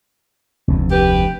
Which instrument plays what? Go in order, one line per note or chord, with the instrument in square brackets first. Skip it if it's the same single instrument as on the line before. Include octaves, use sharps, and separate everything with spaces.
[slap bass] F1 D2
[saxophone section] G4 B4